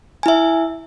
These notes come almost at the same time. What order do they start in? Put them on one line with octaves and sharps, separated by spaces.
G#5 E4 E5